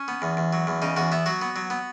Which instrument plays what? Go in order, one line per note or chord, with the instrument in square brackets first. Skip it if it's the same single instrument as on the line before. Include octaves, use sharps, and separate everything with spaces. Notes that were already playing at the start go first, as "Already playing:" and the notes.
Already playing: [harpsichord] C#4
B3
E2
E2
F#3
E2
C#3 D#4
E2 F#4
B3 E4
F#3 F#4
B3
F#3
B3